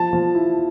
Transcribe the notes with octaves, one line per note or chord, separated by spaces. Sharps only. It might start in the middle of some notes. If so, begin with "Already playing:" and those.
Already playing: F3 A5
F3
E4